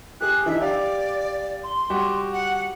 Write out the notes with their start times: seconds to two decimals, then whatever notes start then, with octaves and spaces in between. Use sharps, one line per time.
0.21 G4 G#4 F#6
0.46 E3 D4 D#4 E5
0.60 G4 D5 F5
1.64 C6
1.90 G3 F#4 G4
2.33 F#5